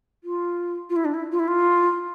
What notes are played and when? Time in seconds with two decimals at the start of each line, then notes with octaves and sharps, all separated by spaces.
0.24 F4
0.90 F4
0.96 E4
1.05 D4
1.14 E4
1.32 F4
1.39 E4
1.48 F4